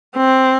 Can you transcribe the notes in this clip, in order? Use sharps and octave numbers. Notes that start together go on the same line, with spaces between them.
C4